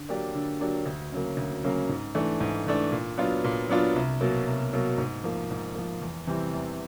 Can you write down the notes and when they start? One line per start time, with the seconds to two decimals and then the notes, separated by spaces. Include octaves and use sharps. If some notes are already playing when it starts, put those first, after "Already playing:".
Already playing: D3
0.09 F#3 A#3 D4 G4
0.35 D3
0.61 F#3 A#3 D4 G4
0.86 D2
1.12 C#3 F#3 A#3
1.37 D2
1.64 C#3 F#3 A#3
1.89 G#2
2.15 E3 A3 D4
2.40 G#2
2.66 E3 A3 D4
2.92 A#2
3.18 F#3 B3 D4 F4
3.44 A#2
3.69 F#3 B3 D4 F4
3.96 C2
4.21 B2 F#3 A#3
4.47 C2
4.73 B2 F#3 A#3
4.98 G#2
5.24 F3 A#3
5.50 G#2
5.75 F3 A#3
6.01 E2
6.27 C3 E3 G3 C4
6.53 E2